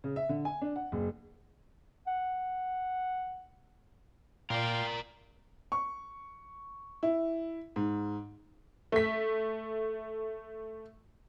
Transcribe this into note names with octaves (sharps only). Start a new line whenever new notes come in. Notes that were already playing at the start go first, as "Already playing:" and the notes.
C#3
E5
D3
G#5
D4
F#5
F#1
F#5
A#2 A#4 D5 F5 G5 C6
C#6
E4
G#2
A3 B6